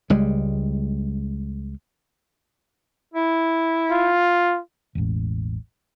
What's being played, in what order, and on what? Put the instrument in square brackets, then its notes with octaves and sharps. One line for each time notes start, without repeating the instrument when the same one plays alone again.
[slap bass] C#2 G3 G#3
[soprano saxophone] E4
[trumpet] F4
[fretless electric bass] E1 A1